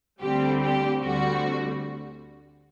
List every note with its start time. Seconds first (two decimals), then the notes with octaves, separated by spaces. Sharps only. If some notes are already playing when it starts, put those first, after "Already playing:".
0.21 D2 D3 G3 C4 G4
0.61 G4
1.01 D2 D3 G3 C4 F#4